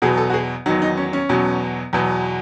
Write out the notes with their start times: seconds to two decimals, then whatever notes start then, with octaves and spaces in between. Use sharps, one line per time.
0.02 E2 B2 F#3 G#4
0.18 A4
0.30 F#4
0.34 G#4
0.66 E2 D#3 F#3 D#4
0.82 D#4
0.98 C#4
1.13 C#4
1.29 E2 B2 F#3
1.93 E2 B2 F#3